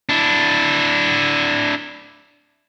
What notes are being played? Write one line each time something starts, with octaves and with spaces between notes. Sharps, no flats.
D4 E4